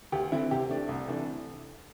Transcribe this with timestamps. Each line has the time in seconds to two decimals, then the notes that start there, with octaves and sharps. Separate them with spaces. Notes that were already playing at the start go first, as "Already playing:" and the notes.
0.12 D2 G4
0.32 D3 C4 E4
0.51 C3 G4
0.69 A3 D4
0.89 C2
1.07 C3 E3 A3 D4